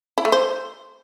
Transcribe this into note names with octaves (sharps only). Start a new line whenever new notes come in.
E4
A3
C5